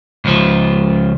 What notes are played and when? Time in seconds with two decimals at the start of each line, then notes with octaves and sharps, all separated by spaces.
0.25 C#2 F3